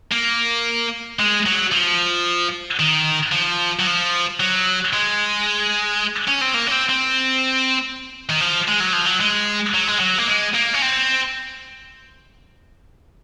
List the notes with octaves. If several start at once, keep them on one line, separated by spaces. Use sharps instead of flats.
A#3
G#3
F#3
F3
D#3
F3
F#3
F3
F#3
G#3
C#4
C4
A#3
C#4
C4
C4
D#3
F3
G#3
F#3
F3
F#3
G#3
F#3
G#3
F#3
A#3
G#3
A#3
C#4
C4